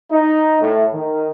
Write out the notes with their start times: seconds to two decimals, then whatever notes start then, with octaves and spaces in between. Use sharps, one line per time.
0.11 D#4
0.62 A2
0.93 D#3